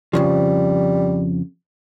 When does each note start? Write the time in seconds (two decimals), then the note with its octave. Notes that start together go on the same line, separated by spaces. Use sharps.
0.13 F2 C#3 F3 G3